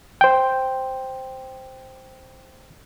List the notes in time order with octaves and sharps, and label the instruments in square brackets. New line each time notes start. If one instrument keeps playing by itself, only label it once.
[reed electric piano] C5 G5